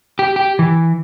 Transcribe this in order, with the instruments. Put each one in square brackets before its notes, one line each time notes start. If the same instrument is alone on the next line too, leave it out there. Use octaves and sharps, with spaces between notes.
[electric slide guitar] G4
G4
E3